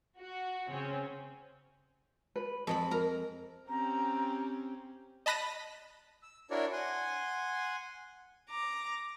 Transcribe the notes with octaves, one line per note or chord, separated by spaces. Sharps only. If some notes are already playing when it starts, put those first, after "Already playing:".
F#4
C#3 C4 C#4
B4
F2 G#3 A4 B5
A#4 A#5
C4 C#4 G4 A#5
D#5 A5 B5 F#6 A#6 D#7
E6
D4 E4 F#4 A#4 C#5 D5
F#5 G#5 C6
A#5 D6